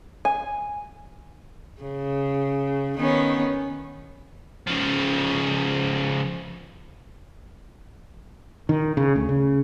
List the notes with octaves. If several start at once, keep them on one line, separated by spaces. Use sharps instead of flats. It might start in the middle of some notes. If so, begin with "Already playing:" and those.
G#5
C#3
D#3 B3 C#4
C#3 F3
D#3
C#3
D2
C#3